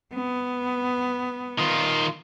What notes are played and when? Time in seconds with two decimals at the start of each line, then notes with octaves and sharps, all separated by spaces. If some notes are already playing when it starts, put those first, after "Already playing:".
0.15 B3
1.59 D#3 F4